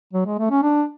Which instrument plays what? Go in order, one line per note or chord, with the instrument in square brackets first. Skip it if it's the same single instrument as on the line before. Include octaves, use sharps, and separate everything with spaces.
[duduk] F#3
G#3
A3
C#4
D4